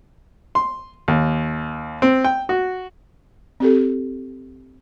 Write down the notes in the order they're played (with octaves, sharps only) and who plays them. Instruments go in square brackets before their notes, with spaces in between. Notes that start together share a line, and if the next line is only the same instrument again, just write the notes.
[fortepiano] C6
D#2
C4
G5
F#4
[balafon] C4 G4 A4